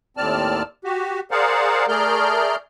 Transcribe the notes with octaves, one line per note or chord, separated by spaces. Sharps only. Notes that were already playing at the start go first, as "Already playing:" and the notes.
D#2 A2 C4 D5 A5 F6
F#4 G4
G#4 A#4 C5 D5 F5 F#5
A3 G#4 A#4 D5 F6 G6